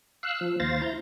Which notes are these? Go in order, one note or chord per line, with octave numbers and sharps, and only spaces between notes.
F5 E6 F#6
F3
D#2 C5 F5 A6 A#6
E4 A#5 G6